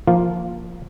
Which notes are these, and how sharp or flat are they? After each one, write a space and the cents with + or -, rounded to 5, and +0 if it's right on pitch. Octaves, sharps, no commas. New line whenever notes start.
F3 +0 A#3 +0 F4 +0